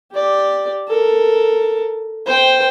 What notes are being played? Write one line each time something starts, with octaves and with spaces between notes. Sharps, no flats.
G4 D5
A4 A#4
C5 G5